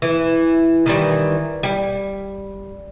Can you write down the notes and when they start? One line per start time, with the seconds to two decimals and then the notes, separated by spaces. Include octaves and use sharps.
0.02 E3
0.86 D#3 E3 G3
1.63 G3